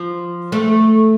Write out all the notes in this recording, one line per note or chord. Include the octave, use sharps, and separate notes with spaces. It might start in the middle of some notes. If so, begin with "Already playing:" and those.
Already playing: F3
A3